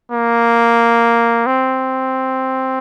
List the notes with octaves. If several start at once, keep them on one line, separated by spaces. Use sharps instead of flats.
A#3
C4